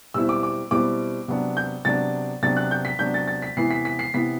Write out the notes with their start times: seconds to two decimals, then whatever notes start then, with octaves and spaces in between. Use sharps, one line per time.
0.14 B2 G3 C4 E4 E6
0.29 D6
0.43 D6
0.71 B2 G3 C4 E4 D6
1.28 C3 F#3 B3 D4
1.57 G6
1.85 C3 F#3 B3 D4 A6
2.42 C3 F#3 B3 D4 A6
2.56 F#6
2.71 G6
2.85 B6
2.99 C3 F#3 B3 D4 G6
3.14 A6
3.28 A6
3.42 B6
3.57 C3 E3 B3 E4 C7
3.71 B6
3.85 B6
3.99 C7
4.14 C3 E3 B3 E4 B6